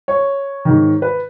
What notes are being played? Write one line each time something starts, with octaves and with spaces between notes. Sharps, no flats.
C#5
G#2 D#3
B4